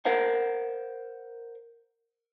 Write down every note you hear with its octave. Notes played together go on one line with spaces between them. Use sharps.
A#4 C5 F5 F#5